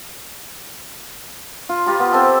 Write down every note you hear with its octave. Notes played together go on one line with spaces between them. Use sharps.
F4
F4 G4 A#5 B5
B3
C4 A4 E5